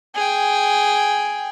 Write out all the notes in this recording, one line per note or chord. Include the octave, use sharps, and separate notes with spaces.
G#4 G5